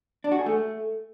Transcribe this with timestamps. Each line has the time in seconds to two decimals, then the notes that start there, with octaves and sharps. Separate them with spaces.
0.24 D4
0.32 F#4
0.39 G#4
0.46 A3